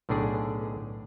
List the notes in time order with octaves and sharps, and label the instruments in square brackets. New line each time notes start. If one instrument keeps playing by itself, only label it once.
[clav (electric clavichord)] B1 A2 D3 D4 G#4 D5